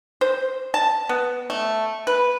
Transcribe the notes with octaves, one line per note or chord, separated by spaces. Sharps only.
C5
A5
B3
A3
B4